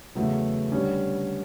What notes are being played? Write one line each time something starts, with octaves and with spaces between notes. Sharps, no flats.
E2 C#3 F#3 A3
D3 G3 C#4